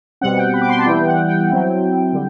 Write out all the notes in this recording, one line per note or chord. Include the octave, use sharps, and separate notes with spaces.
B2 G3 C4 F#5
G5
B5
D6
C6
A5
E3 G3 B3 E4 G5
F#5
G5
F#3 C4 E4
D3 G3